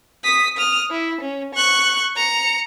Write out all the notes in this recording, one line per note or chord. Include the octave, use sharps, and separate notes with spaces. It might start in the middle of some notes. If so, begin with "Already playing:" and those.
D#6 B6
D#6 F6
E4
C#4
C#6 F#6
A#5 C#7